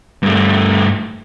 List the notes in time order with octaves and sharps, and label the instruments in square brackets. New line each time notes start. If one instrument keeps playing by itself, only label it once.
[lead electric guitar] G2 A3